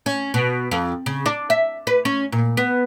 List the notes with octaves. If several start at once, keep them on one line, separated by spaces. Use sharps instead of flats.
C#4
B2
F2
C#3
D4
E5
B4
C#4
A#2
B3